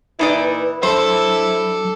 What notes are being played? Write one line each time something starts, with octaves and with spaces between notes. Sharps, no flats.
A#2 E3 D#4 E4 B4 D5
F#3 D4 E4 A4 C5